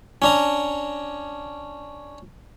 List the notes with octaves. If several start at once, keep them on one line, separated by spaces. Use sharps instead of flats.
C#4 D4 A#5